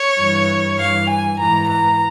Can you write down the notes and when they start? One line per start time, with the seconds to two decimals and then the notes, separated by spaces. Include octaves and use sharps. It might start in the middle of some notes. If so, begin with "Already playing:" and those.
Already playing: C#5
0.18 G2 E3
0.78 G2 E3 F5
1.09 G#5
1.39 G#2 E3 A#5
1.69 A#5